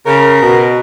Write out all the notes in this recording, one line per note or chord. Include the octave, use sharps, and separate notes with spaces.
C#3 A#4
B2